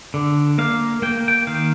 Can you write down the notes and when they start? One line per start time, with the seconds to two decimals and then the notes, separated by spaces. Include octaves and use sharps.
0.14 D3
0.58 A#3 F5
1.02 A#3 G5
1.28 G5
1.47 D#3 F5